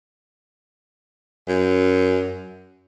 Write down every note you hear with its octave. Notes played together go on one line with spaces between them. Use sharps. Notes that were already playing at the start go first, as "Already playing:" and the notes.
F#2